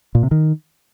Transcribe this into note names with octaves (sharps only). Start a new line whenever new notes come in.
A#2
C3
D#3